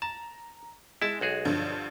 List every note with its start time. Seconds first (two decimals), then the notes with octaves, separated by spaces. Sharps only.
0.02 A5 A#5
1.02 G#3 E4 A5 E7
1.21 B1 F#4 G#4
1.45 G2 D3 F3